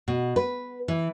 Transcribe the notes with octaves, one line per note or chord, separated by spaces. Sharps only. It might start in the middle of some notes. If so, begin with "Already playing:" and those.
B2
B4
E3